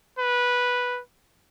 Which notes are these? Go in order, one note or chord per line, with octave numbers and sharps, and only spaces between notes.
B4